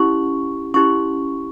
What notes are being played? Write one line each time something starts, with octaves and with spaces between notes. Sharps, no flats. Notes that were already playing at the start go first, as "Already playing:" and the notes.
Already playing: C#4 E4 G4 C#6
C#4 E4 G4 C#6